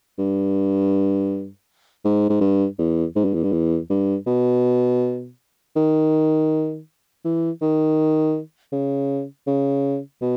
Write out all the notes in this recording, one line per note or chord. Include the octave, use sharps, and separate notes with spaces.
G2
G#2
G#2
G2
E2
G#2
G2
E2
G2
E2
G2
B2
D#3
E3
D#3
C#3
C#3
B2